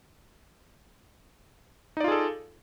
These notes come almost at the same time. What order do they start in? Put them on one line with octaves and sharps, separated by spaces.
D#4 D5 F4 G#4 A4